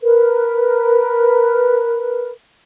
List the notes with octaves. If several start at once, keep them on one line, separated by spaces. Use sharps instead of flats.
A#4 B4